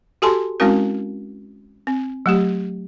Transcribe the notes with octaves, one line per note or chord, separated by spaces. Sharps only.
F#4 G4 A4 G#5 A5 C6
G#3 C4 C#4 E4 F#4 A#4
C4
F#3 A3 G4